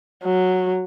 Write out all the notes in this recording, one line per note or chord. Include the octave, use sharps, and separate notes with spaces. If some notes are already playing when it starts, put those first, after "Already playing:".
F#3